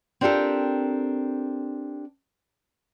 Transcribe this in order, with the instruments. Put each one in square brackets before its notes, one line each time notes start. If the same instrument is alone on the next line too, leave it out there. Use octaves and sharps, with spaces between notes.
[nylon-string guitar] C4 D4 F4 G4 A4 A#4